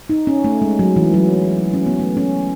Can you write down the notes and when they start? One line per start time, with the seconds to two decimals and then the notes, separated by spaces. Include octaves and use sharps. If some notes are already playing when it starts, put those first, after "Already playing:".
0.09 D#4
0.27 C#4
0.44 A3
0.62 G#3
0.79 F#3
0.96 E3
1.14 F#3
1.74 C#4
1.86 B3
2.00 A3
2.17 C#4